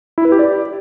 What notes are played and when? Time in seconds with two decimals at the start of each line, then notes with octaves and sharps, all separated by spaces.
0.18 E4
0.25 B4
0.32 G4
0.39 D5